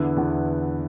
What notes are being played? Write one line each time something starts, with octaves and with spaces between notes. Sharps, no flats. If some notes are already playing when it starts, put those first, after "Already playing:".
Already playing: E2 D3 B3 E4
E2 D3 B3 E4